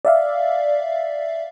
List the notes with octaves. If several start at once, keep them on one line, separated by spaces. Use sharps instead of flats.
D5 E5 F5